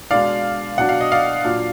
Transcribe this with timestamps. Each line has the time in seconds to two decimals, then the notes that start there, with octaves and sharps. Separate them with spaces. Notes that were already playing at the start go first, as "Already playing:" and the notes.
0.11 B2 G#3 D4 D5 F5
0.78 B2 F#3 D4 F#5
0.89 F5
1.01 D#5
1.12 D5 F5
1.44 A#2 F#3 D4